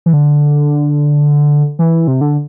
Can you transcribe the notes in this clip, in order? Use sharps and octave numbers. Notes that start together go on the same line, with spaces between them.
E3
D3
E3
C3
D3